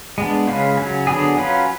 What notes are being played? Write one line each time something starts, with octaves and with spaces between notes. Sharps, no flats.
G#3 B3 D4
C#3 G#3 C#4 F4 B4
C#3 F#3 C#4
D3 F#3 B3 D4 G#4
F#3 C#4 F4 B4